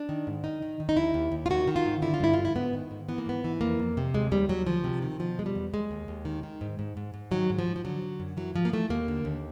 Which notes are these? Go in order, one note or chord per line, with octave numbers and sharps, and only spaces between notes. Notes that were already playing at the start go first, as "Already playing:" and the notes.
Already playing: D4
D#3
G#2
D#3 D#4
D#3
D#3
D#4
D#2 E4
D#2
D#2
F4
D#3 F#4
D#3
F4
G#2
D3 E4
F4
G2 E4
D3 F4
E4
G#2 B3
D#3
G#2
E3 B3
A#3
G#2 B3
E3
F2 A#3
F2
C3
D#2 G#3
D#2 G3
D#2 F#3
D2 F3
C3
D#3
B2 F3
E2 G#3
G3
E2
D#2 G#3
D#2
D#2
D#3
D#3
G#2
G#2
G#2
G#2
D#3 F#3
G#2
F3
G#2
F3
D3 F#3
D3
F#2
E3 F#3
G#2 F3
A#3
E3 A3
D#2 A#3
D3
D#2